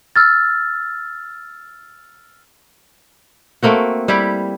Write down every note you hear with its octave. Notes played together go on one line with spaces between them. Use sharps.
E6 F6 A6
A3 A#3 C4 F#4
G3 E4 G4